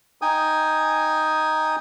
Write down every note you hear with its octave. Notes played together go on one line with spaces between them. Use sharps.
D#4 G5 G#5 D#6